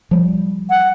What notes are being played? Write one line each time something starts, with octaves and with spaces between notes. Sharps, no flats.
F3 G3
F#5